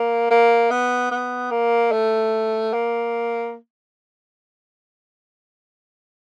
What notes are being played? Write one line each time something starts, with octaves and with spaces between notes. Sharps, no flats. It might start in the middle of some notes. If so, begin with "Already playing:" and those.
Already playing: A#3
A#3
B3
B3
A#3
A3
A#3